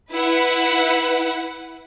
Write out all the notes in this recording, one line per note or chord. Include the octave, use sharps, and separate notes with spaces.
E4 B4 F#5